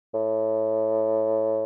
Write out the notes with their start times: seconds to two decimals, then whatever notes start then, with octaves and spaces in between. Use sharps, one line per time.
0.14 A2